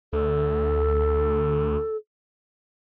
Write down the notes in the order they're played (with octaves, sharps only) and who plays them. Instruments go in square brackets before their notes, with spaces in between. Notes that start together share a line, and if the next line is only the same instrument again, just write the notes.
[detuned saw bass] D2 [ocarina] A4